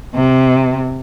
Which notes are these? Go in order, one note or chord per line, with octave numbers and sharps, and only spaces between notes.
C3